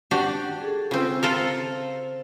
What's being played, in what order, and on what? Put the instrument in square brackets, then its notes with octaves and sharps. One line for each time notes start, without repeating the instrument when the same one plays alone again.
[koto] D4 F#4 G4
[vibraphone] G#4 A4
[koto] C#3 C4 [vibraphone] F4 E6
[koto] F4 A4 A#4 [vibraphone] C5